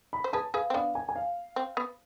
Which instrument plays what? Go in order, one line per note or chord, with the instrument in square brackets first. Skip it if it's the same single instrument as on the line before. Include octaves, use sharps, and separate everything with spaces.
[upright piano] B5
[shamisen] C5
[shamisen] G#4 B4 [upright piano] A5
[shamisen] G#4 B4 [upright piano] F5
[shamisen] C4
[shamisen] B3 D4 [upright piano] F5
[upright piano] G#5
G#5
F5
[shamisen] C4
B3